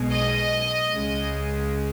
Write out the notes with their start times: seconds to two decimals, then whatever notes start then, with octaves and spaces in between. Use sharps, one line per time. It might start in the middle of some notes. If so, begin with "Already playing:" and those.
Already playing: B1 B2 G#3
0.11 D#5
0.92 C#2 C#3 G#3